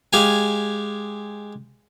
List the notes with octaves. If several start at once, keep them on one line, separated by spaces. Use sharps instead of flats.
G#3 G4 F5 G#5